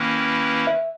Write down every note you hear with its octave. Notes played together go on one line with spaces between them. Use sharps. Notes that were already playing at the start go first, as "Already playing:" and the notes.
Already playing: D#3 A#3 C#4 E4 B4
E5